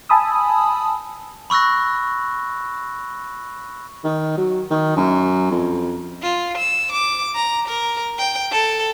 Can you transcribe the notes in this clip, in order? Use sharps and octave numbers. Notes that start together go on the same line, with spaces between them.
G#5 A5 B5 D#6 E6
B5 C#6 E6 F#6 A#6
D#3
F#3
D#3
F#2
F2
F4
E6
D6
A#5
A#4
G5
A4